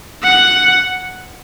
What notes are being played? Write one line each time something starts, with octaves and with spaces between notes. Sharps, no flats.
F#5